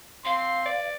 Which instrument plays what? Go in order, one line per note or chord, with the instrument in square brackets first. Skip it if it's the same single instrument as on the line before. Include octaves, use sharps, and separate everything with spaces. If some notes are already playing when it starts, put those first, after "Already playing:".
[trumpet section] C4 C6 [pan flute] F5
[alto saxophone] D5